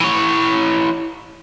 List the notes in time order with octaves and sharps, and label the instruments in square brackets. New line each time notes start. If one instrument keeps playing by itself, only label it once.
[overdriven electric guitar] E3 C#5